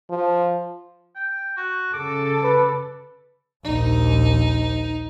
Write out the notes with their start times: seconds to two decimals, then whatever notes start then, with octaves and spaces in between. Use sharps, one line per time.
0.10 F3
1.16 G5
1.57 F#4
1.93 C#3 A4 D6
2.43 B4
3.64 A#1 D#2 D#4